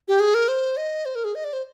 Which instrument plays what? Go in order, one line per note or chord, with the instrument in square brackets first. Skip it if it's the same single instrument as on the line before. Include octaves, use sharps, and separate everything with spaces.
[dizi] G4
G#4
A#4
C5
D#5
C5
A#4
G#4
D#5
D5
C5